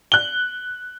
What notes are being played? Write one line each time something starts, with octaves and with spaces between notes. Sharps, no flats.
F#6 G7